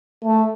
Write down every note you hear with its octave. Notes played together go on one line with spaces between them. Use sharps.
A3